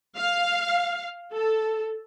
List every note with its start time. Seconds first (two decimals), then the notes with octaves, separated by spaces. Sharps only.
0.17 F5
1.33 A4